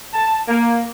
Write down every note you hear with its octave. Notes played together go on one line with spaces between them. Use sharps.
A5
A#3